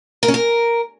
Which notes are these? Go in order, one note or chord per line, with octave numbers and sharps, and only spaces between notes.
A#4
C#4
A#4